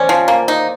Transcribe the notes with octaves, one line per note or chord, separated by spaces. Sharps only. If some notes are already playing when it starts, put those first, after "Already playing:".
Already playing: C#4 C5 D5
F3
A#3
D#4